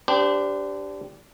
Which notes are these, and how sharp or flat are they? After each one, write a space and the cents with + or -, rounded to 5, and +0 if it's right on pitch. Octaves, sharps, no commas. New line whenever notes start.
D4 -20 G4 +0 C5 -35